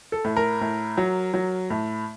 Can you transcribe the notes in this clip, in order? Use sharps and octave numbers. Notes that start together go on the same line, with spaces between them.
A4
A2
A#4
A2
F#3
F#3
A2